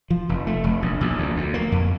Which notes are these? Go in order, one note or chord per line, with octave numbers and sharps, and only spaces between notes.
F3
F1
A3
F1
A#1
A#1
D2
D2
A#3
F2